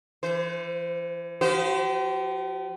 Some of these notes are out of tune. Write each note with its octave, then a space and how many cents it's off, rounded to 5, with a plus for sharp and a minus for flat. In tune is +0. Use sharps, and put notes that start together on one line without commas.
E3 +35 C5 -15
F3 +20 G4 -45 C5 -40